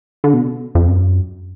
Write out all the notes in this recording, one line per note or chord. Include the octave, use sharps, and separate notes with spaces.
D3
B2
F2
F#2